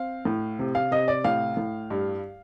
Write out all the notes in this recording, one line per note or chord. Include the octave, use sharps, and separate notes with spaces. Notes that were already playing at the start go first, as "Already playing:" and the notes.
Already playing: C4 F5
A2
C3
F5
C3 D#5
D5
A2 F5
A2
G2